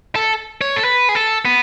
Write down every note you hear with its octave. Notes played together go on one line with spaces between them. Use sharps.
A4
C#5
A4
B4
G#4
A4
B3